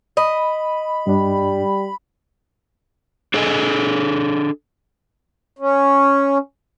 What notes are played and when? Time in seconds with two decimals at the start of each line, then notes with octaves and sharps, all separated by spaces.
0.17 D#5 B5
1.07 G2 G3 D4
3.34 D4 G#4 A4 D#5 G#5
5.59 C#4